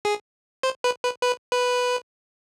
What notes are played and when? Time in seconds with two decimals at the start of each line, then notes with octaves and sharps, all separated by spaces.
0.05 G#4
0.63 C5
0.84 B4
1.03 B4
1.23 B4
1.52 B4